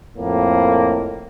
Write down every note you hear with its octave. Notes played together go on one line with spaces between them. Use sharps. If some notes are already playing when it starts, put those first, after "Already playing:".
F2 A2 A#3